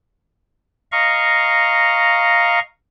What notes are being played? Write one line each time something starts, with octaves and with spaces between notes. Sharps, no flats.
D#5 F5 A#5 C#6